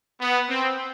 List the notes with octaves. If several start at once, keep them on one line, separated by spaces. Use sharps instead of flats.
B3
C4